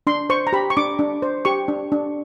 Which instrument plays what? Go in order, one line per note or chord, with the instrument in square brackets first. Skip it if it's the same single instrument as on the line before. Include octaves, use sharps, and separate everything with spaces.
[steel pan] D4 C6
C5 C#6
A#5
G4 B5
C#6
D4 D6
D4
C5
G4 C#6
D4
D4